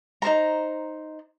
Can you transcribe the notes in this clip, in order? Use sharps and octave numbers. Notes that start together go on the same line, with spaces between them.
D#4 A#4 C5 A#5